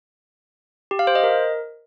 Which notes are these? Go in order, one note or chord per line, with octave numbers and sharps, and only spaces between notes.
G4
F5
C5
D#5
A#4